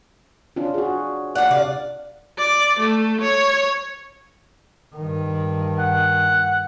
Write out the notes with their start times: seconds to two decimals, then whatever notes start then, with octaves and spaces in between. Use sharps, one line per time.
0.56 C#4 D4 F4
0.74 F#4 G#4
1.35 A2 D5 F#5
1.51 C3 D5 F5
2.38 D5
2.80 A3
3.22 C#5
4.95 G2 D#3
5.79 F#5